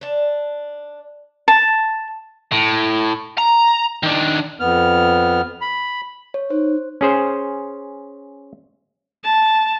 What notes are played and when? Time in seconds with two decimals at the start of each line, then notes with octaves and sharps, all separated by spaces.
0.01 D4 A5
1.48 A5
2.52 A2
3.38 A#5
4.03 D#3 D4
4.60 F2 B3 F6
5.61 B5
6.34 C#5
6.51 D#4 C5
7.01 C#4 G#4 C5
9.23 A5